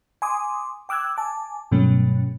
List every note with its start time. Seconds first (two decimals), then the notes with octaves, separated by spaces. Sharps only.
0.22 G#5 C6 D6 D#6
0.89 G5 D6 E6 F#6 G#6
1.17 G#5 A5 D6
1.72 G2 B2 F#3 A3 C#4